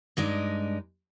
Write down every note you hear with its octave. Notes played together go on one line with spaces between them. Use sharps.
G2 G#3 D4 D#4